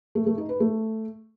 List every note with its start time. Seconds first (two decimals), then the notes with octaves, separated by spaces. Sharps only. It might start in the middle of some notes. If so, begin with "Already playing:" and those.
0.15 A3
0.26 A3
0.38 D#4
0.49 B4
0.60 A3